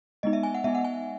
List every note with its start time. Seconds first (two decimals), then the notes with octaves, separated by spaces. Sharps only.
0.23 G#3 B3 D#4 D#5
0.33 E5
0.43 G#5
0.54 F#5
0.64 G#3 B3 D#4 E5
0.75 F#5
0.84 G#5